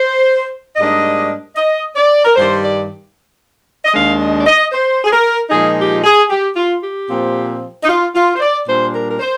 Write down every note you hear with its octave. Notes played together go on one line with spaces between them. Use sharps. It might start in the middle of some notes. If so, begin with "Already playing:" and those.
Already playing: C5
G#2 G3 A#3 D4 D#5
D#5
D5
A#4
G2 D#3 G3 C5
D5
D#5
D#2 D#3 G#3 D4 F5
D#5
D5
D#5
C5
G#4
A#4
A#2 F3 G#3 D#4 G#4
G4
G#4
G4
F4
G4
A#2 F3 C4
D#4
F4
F4
C5
D5
A#2 G3 D4 C5
A#4
A#4
C5